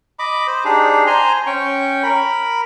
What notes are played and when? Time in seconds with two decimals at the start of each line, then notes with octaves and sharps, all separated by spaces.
0.19 D#5 B5 D6
0.47 C5
0.65 D4 D#4 G4 G#4
1.07 C5 G#5 A#5 C6
1.46 C#4 G5 C#6
2.03 A#4 B5